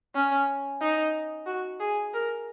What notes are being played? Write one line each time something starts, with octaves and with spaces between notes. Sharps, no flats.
C#4
D#4
F#4
G#4
A#4